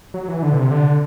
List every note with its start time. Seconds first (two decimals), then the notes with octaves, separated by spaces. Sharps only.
0.14 F#3
0.28 E3
0.43 D3
0.52 B2
0.57 C3
0.71 D3